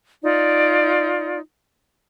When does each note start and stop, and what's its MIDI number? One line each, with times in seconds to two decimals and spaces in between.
0.22 1.39 63
0.22 1.39 65
0.22 1.39 74